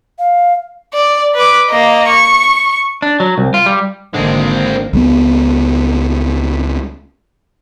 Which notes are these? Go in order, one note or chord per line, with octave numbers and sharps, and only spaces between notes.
F5
D5
B4 D6
A#3 D#5
C#6
D4
F#3
C2
F4
G3
G#1 D3 G#3 A#3 C4
C#2 G3 B3